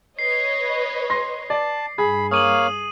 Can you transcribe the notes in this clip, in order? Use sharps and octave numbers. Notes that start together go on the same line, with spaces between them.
B4 C#5 D#5 C7
C6 A#6
D5 A5
G2 G#4 B5
A#3 C#5 F5 D#6 D#7 F#7